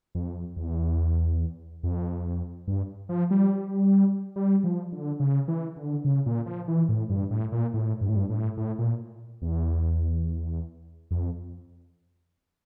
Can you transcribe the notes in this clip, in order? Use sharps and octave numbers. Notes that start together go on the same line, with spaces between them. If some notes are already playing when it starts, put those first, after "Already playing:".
F2
E2
F2
G2
F3
G3
G3
F3
D3
C#3
E3
D3
C#3
A#2
F3
E3
A2
G2
A2
A#2
A2
G2
A2
G2
A2
A2
A#2
E2
F2